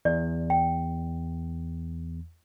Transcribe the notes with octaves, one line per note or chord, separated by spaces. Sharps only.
E2 D5
G5